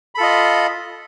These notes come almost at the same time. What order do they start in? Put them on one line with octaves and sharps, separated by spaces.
B5 A4 F4 D#5